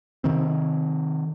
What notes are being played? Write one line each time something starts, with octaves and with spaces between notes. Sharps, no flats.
C3 D#3 C4